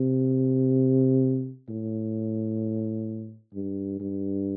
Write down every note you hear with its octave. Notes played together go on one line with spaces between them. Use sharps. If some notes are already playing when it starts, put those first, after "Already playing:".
Already playing: C3
A2
G2
G2